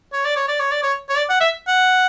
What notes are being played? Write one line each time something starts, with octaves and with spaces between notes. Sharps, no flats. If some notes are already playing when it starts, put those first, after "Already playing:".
C#5
D5
C#5
D5
C#5
D5
C#5
C#5
D5
F#5
E5
F#5